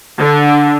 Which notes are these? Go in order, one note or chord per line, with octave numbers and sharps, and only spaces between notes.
D3